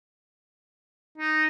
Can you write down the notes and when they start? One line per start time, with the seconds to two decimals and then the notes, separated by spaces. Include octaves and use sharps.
1.18 D#4